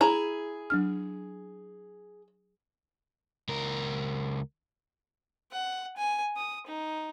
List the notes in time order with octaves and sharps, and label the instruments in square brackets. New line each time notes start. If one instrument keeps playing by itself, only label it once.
[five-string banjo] E4 A#5 [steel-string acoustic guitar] G#4
[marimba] F#3 D4 F6
[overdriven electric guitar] C#2 A#4
[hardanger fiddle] F#5
G#5
D#6
D#4